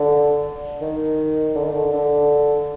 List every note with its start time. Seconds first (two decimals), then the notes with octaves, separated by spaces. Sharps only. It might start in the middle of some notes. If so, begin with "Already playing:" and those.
Already playing: D3
0.81 D#3
1.56 D3
1.64 D#3
1.71 D3
1.93 D3